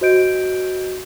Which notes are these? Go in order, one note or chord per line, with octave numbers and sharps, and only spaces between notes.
F#4 C5 D#5 G6 D7